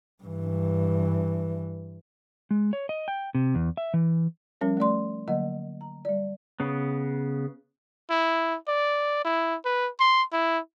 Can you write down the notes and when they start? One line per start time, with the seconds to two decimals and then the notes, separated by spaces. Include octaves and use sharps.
0.23 G2 E3
2.51 G#3
2.73 C#5
2.89 D#5
3.08 G5
3.35 C3
3.55 E2
3.77 E5
3.94 E3
4.61 F3 G3 C#4 A#4 C#5
4.77 A3 C#4 D5 C6
5.28 D3 F#3 A#3 D#5 F#5
5.81 A#5
6.05 G3 D5
6.60 C#3 B3
8.10 E4
8.68 D5
9.25 E4
9.65 B4
10.00 C6
10.33 E4